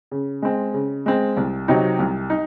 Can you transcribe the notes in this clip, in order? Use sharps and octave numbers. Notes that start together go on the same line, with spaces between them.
C#3
G#3 C4
C#3
G#3 C4
C2
C3 F#3 C4 D#4
C2
D#4